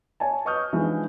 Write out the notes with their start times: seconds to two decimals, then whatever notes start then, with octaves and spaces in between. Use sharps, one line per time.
0.20 C#5 G#5 A5
0.45 B4 D#5 C#6 D#6 F6 G6
0.73 E3 F3 G#3 D4 D#4